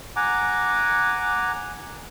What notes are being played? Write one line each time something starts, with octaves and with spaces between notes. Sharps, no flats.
F#5 G#5 A#5 D6